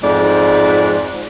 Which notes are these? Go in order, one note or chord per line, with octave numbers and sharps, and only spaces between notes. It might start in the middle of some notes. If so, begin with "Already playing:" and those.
F2 G#2 D5